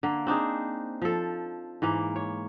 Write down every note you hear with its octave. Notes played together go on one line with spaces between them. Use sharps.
D3 A#3
C4 D4 D#4 G#4
F3 A4
G#2 E3 A#3
C#5